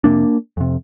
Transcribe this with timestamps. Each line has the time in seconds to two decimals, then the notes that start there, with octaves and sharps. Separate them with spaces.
0.04 F2 C3 A#3 D4
0.57 F2 C3